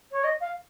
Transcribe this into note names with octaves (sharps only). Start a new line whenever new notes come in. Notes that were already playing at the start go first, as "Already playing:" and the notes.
C#5
D#5
F5